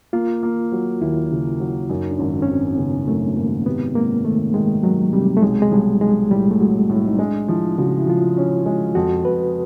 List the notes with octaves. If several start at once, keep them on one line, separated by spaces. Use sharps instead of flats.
A#3 F4
A#3
F#3
D#2 E4
C#3
F#3
F#2 D#4
D4
G#1 C#4
C#4
G#1 C4
C#3 B3
F#2 A3
G#1 A#3
C3 B3
G#3 A#3
D#3 A3
D#3 G#3
D#3 F#3
C3 G3
A3
B1 G#3
G#3
B1 G3
B1 G#3
A2 G3
A3
F#3 G#3
A2 A3
D#4
G#3 D4
F3 E4
C#3 F#4
F4
E4
F3 F4
C#4
G#3
F2 F#4
F2 B4